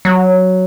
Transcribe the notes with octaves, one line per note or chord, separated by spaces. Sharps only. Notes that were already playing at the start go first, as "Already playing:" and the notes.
F#3